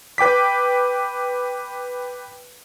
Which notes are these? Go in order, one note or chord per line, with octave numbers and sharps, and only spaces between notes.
B4 G5 D6 B6